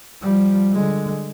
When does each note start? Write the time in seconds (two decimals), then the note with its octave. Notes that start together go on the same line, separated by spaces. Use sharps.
0.22 F3 G3
0.72 D3 G#3